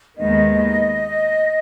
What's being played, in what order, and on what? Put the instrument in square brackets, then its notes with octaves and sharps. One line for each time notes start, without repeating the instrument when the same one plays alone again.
[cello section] D#2 D#3 G#3 B3 [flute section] D#5